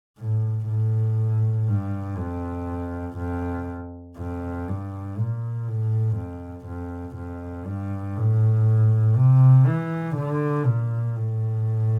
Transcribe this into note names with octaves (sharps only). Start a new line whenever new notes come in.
A2
A2
G2
F2
F2
F2
G2
A#2
A2
F2
F2
F2
G2
A2
C3
E3
D3
A#2
A2